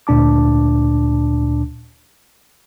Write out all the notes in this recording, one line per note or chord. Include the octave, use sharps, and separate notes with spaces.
D2 A#2 D4 A5 D6